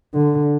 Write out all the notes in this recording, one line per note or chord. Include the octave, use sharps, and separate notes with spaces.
D3